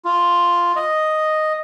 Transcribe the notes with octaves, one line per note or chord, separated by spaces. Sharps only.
F4
D#5